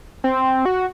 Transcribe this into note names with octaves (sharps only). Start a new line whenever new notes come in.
C4
F#4